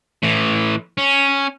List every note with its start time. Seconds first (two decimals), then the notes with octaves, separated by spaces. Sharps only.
0.23 A2 E3
0.98 C#4